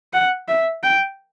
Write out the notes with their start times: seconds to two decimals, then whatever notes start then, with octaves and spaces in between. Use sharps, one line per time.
0.13 F#5
0.48 E5
0.83 G5